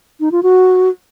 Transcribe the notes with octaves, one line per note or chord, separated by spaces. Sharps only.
D#4
F4
F#4